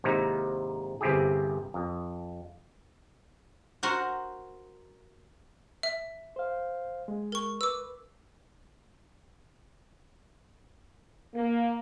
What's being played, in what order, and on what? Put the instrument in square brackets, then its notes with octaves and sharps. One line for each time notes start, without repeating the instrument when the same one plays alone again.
[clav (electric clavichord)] G#1 C3 A#3 D#4 E4 A#5
G1 C3 C4 E4 G4 G#4
F2
[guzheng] F#4 A#4 C5 F#5
[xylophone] E5
[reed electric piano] C5 F5
G#3
[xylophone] A#4 C#6
[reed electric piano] B4 [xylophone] D6 E6
[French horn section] A#3